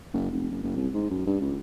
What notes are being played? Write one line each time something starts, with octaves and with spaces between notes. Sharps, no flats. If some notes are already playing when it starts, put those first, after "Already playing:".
F#1
F1
F#1
F#1
C2
G#2
F#2
G2
C#2